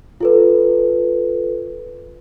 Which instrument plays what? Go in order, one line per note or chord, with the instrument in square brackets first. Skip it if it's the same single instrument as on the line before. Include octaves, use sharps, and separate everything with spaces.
[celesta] F4 A4 B4